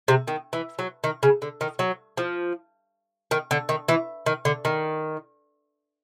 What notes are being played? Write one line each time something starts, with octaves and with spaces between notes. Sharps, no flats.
C3
D#3
E3
F#3
D#3
C#3
D3
D#3
F#3
F3
D#3
D3
D#3
E3
D#3
D3
D#3